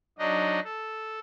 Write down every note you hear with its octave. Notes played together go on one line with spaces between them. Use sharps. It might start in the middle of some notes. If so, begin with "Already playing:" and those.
F#3 D4 D#4 D#5
A4